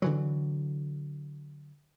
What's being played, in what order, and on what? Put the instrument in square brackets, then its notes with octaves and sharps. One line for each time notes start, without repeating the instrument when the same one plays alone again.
[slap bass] D3 E3 F#3